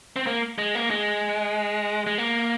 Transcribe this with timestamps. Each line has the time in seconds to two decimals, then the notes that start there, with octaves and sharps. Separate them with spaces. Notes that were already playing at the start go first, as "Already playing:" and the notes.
0.16 C4
0.27 A#3
0.58 G#3
0.75 A#3
0.90 G#3
2.06 G#3
2.18 A#3